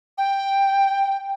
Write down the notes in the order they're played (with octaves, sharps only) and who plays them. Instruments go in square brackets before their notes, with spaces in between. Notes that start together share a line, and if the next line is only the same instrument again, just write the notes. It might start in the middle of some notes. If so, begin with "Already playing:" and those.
[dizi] G5